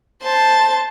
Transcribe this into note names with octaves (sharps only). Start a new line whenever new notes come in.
C5 A5